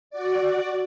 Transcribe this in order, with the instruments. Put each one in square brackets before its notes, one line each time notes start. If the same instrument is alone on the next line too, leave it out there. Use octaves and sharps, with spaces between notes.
[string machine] F#4 D5